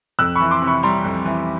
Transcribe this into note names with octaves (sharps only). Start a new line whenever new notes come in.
F2 E6 F#6
E3 B5 C#6
C6 D6
C3
B5 C#6
G3 A#5 C6
F2
E3